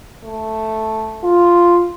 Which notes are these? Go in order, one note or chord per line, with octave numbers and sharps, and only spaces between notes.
A3
F4